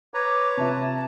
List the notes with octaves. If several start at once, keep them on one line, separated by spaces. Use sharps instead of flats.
B4 C#5 A#5 D6
C3 F4 E5 A5